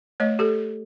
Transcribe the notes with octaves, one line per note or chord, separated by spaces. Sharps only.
A3 C#5 D#5
G4 A4